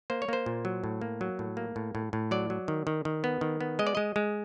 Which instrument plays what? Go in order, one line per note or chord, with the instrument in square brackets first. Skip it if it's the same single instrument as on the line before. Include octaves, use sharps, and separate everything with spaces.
[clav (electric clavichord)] A#3 C5
C#5
A#3 C5
A#2
F#3
A2
A#3
F#3
A2
A#3
A2
A2
A2
F#3 D5
F#3
D#3
D#3
D#3
B3
D#3
B3
G#3 D#5
D5
G#3 D#5
G#3